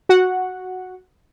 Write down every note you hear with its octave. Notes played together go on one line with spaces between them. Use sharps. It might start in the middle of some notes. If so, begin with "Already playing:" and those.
F#4 F#5